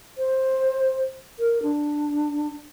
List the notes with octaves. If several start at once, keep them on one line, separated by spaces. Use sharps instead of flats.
C5
A#4
D4